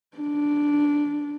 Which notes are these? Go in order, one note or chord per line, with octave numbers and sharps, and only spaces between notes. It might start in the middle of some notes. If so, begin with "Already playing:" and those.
D4